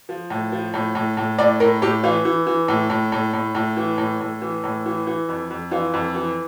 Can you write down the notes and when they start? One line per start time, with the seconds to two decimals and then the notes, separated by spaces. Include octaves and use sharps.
0.09 F3
0.30 A2
0.52 F3
0.74 A2
0.95 A2
1.17 A2
1.38 A2 D5
1.60 A2 A#4
1.82 A2 G4
2.03 E3 F4
2.25 E3
2.47 E3
2.68 A2
2.90 A2
3.12 A2
3.33 A2
3.55 A2
3.77 E3
3.98 A2
4.20 A2
4.42 E3
4.64 A2
4.86 E3
5.07 E3
5.29 F2
5.51 F2
5.71 E3 F4
5.94 F2
6.15 E3